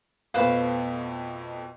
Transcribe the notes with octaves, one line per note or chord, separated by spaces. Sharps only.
F2 B2 A3 B4 C5 F5